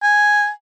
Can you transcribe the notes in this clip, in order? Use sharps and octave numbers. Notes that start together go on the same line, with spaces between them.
G#5